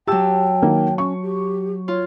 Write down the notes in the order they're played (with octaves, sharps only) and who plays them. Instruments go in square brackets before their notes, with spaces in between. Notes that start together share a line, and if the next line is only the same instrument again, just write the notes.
[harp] F#3 A5 [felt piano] G4 E6 [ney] G5
[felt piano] D#3 A#3
[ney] C#4 [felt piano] C#6
[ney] G4
[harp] F4 [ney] C#5